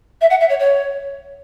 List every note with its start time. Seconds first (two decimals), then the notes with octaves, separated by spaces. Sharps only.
0.21 E5
0.30 F#5
0.40 E5
0.49 C#5
0.60 C#5